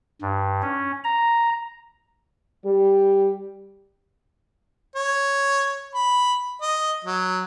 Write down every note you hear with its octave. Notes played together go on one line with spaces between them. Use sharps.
G2
C#4
A#5
G3 G4
C#5
B5
D#5
F#3